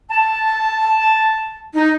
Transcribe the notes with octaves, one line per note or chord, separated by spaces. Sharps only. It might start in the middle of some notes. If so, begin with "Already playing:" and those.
A5
D#4